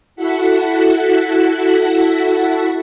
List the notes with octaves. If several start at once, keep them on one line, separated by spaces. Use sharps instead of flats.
E4 F#4 A4 F#5 B6